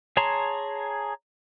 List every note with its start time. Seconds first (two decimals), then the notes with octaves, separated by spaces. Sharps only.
0.17 G#4 C#5 A5 A#5 C6